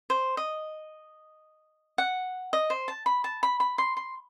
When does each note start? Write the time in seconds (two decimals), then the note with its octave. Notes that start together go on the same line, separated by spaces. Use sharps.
0.10 C5
0.37 D#5
1.98 F#5
2.53 D#5
2.70 C5
2.88 A5
3.06 B5
3.24 A5
3.43 B5
3.60 B5
3.78 C6
3.97 C6